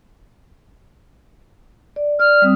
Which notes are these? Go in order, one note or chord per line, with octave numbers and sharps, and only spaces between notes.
D5
D5 F6
G3 C4 D#6